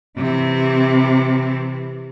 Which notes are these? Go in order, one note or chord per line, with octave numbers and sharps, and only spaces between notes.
C3 E3